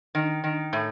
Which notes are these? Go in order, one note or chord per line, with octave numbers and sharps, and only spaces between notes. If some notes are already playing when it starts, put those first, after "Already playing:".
D#3
D#3
A2